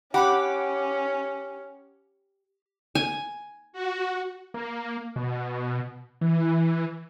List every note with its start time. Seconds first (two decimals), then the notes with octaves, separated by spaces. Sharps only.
0.14 C#4 G4 F#5 B5 D6
2.95 G#5
3.73 F#4
4.54 A#3
5.16 B2
6.21 E3